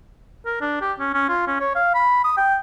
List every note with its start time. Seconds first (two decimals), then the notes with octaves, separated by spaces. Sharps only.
0.46 A#4
0.61 D4
0.82 G4
0.99 C#4
1.14 C#4
1.29 F4
1.47 C#4
1.60 C#5
1.75 F5
1.95 B5
2.24 D#6
2.37 G5